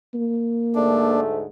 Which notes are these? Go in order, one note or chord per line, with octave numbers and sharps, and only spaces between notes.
A#3
D2 G#2 A3 D4